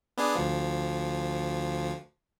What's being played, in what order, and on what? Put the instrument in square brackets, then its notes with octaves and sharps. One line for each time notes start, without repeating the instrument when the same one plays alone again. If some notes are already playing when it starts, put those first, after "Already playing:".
[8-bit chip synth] B3 D4 G#4
D2 F3